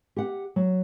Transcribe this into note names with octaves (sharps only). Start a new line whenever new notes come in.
G4 F#5
F#3